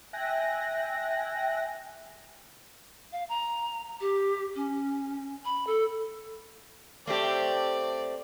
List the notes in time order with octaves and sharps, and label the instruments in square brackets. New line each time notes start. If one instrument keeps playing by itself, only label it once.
[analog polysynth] E5 G5 G#5 F#6 A#6
[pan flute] F5
A#5
G4
C#4
B5
A4
[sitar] A3 C4 G4 [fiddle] D5